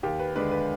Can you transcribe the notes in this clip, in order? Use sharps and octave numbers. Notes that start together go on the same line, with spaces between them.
D#2 G4
B4
D3 G#3 D4 B4
B4